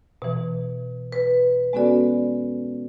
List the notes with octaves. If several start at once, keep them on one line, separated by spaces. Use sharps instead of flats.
B2 E3
B4
G#3 B3 C#4 F#4 A4 D5